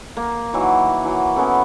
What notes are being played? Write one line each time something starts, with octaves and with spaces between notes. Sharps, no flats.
A#3
D#3 E3 F#3
E3 F#3
B3 C#4 E4 A4